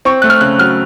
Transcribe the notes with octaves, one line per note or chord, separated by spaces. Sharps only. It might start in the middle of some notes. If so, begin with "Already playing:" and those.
C4 C#6
A3 F#6
F6
C#3 F#6
F#3 F6